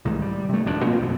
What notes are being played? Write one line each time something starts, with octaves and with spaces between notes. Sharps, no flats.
C2 G#2 D#3 A3
G3
C3 A3
D1 F2 F3 D4
A#2 A#3 C4
B1 F#2